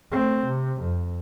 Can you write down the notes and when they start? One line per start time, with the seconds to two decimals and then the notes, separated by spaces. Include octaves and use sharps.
0.12 A3 C4
0.46 C3
0.81 F2